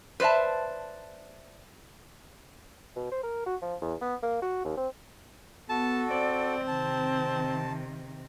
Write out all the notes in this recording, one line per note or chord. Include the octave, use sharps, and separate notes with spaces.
B4 C5 D5 E5 A5
B2
C5
A#4
F#4
F3
E2
B3
A#3
F#4
D#2
C4
B3 F#4 A4 A5
C4 D5
C3 D#3 A5